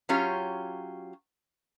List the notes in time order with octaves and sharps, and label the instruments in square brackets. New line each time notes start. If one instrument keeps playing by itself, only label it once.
[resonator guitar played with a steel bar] F#3 C#4 F4 G4